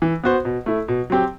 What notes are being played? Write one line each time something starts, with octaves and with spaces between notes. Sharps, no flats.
E3
B3 F#4 C5
B2
A3 E4
B2
F#3 C4 G4